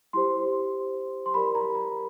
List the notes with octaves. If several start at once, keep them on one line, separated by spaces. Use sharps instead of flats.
E4 G4 C5 C6
C6
G4 A#4 D5 B5
A#5
A#5